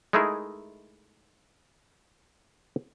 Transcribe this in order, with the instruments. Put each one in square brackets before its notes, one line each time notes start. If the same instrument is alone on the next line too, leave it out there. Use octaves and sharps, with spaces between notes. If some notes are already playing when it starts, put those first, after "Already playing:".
[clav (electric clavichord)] G#3 A3 D#4 E4 G#4 A#4